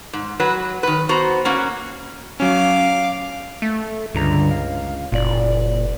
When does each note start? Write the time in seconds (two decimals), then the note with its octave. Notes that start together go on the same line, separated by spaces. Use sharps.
0.13 G#2
0.40 F#3 B4
0.83 D#3 B4
1.09 B3 F#4 C5 A#5
1.45 A#3 C#4 F#4
2.40 F#3 C#4 F5 D6
3.62 A3
4.15 C#2 G2 D3 A#5
4.51 F5
5.12 F#1 A#2 D5